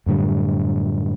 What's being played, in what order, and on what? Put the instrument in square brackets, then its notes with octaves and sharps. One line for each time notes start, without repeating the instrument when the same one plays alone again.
[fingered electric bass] F#2 A2 D3 G3